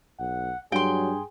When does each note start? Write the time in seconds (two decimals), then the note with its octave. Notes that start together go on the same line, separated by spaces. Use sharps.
0.20 B1 F#5
0.72 G2 F#3 G#4 G5 C6